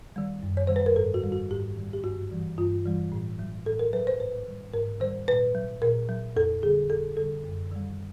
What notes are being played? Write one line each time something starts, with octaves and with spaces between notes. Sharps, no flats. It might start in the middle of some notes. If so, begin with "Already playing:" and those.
D#3 G3
F#2
C#5
D#3 G3 C5
B4
A#4
G#2 A4
F#4
D#3 G3
F#4
G#2 G4
D#3 G3
G4
G2 F#4
E3 G3
G2 F4
E3 G3
A2
F#3
A2 A4
A#4
F#3 B4
C5
G#2 B4
D#3 G3
G#2 A#4
D#3 G3 C5
A#2 B4
F#3
A#2 A#4
F#3
F2 A4
D3 G3 G#4
F2 A4
D3 G3 A4
F#2
D#3 G3